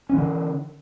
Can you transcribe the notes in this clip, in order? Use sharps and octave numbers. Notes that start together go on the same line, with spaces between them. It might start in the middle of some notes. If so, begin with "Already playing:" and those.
D3 E3 C#4